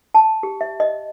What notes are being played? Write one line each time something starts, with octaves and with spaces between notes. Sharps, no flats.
A5
G4
E5
D#5